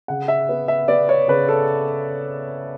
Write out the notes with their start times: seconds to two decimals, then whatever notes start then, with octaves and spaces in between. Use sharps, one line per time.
0.08 C#3 F#5
0.28 E5
0.49 B3
0.68 E5
0.88 B3 D5
1.09 C#5
1.28 C#3 B4
1.49 A4